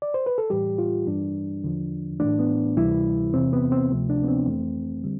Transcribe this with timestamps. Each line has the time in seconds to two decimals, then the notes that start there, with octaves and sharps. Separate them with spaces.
0.02 D5
0.14 C5
0.26 B4
0.38 A4
0.50 A2 E3 G3 G4
0.78 F4
1.07 G2 E3 G3 D4
1.64 E2 D3 F3
2.20 A2 E3 A3 D4
2.39 B3
2.77 D2 C3 E3 G3 E4
3.33 E2 C3 E3 C4
3.53 B3
3.72 C4
3.90 D2 C3 F3 A3
4.10 D4
4.23 B3
4.28 C4
4.47 F2 E3 A3
5.04 D3 G3